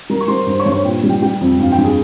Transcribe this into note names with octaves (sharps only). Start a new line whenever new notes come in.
G3 A#4 A#5
C#6
G3 C5 C6
G2 C5 C6
C#5 C#6
G2
C#5 C#6
A#2 G5
G3
G5
G3 G5
F2
G2 F5
G5
G2
G#4 G#5